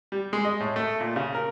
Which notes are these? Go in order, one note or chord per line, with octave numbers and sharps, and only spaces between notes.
G3
G#3
D#5
A2
A3
A#2
C#3
A#4